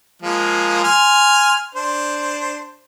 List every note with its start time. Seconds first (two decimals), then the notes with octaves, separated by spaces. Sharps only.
0.22 F3 G#3 A#3
0.84 G#5 C6 F6
1.75 D4 C5